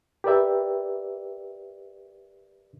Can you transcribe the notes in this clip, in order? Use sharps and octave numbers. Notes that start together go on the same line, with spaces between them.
G4 A#4 B4 D5 E5 G5